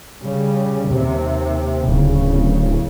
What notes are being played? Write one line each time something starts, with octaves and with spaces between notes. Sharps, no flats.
C#3 G3
D#2 C3
D1 C#3